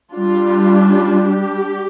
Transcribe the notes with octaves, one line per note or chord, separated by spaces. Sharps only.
G3 D4 F4
F4
G4